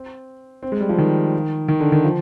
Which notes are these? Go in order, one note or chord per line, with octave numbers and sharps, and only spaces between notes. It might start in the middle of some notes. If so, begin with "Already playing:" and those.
Already playing: C4
C4
G#3
G3
F3
D#3
D#3
D3
D#3
F3